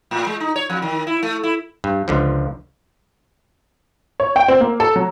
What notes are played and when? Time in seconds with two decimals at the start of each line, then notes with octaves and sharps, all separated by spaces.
0.11 A2
0.27 G#3
0.40 D#4
0.56 C#5
0.70 F2
0.82 D#3
1.07 E4
1.23 A3
1.43 E4
1.84 G2
2.08 C#2 D3 F3
4.20 C#5
4.36 G5
4.48 C4
4.61 A#3
4.80 A4
4.96 F#3